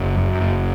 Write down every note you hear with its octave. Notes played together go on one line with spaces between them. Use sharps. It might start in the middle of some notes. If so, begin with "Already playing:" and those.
Already playing: F#1
F#2
F#1